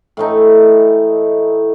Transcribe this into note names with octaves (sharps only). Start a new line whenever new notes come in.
A2 E3 A3 D#4